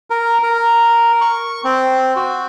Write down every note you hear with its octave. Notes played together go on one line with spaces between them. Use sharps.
A#4
A#4
C#6
C4
F#4